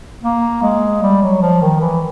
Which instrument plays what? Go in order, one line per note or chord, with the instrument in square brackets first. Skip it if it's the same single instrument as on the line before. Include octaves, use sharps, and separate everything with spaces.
[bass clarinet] A#3
G#3
G3
F#3
F3
D#3
E3